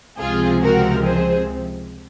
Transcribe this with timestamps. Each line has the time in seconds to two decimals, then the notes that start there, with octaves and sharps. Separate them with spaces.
0.19 C#2 C3 F3 G#3 C4 F4 G#4
0.62 F#4 A#4
1.04 G#4 C5